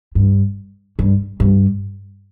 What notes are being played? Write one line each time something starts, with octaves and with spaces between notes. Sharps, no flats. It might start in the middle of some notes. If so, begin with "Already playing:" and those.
G2
G2
G2